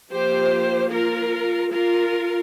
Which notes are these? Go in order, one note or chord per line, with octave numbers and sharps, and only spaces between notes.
F3 A#3 G4 C5
F4 A#4
F4 A#4